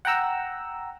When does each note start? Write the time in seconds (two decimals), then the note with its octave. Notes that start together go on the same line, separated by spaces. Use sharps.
0.05 F#5 G5 A#5 E6